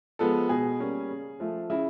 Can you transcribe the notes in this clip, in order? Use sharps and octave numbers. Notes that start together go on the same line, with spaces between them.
F3 G#3 B3 A4
B2 G#4
G3 A#3 C#4
C#3
F3 A3
C#3 E4